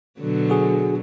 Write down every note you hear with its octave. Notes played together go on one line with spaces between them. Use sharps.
B2 D3 F#3
F#4 G#4